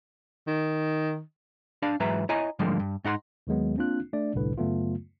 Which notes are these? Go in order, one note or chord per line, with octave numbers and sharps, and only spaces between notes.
D#3
D4 D5 F5 A5
G#2 E3 F#3 B4 E5 A#5
E4 C#5 D#5 G#5 A#5
G#2 D3 F3 G3 G#3 A#3
G2
G#2 D#4 F#5 B5 C6
D#2 D#3 F#3 G#3 B3
A#3 C4 D4 F4 F#6
A3 D4 D5
G1 C2 A2 D3 B4
F#2 C#3 F#3 A3 B3 F4